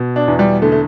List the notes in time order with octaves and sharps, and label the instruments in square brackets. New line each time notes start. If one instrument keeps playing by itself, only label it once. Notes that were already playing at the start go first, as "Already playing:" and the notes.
Already playing: [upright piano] B2
D4
E2
G3
D3 A3
A3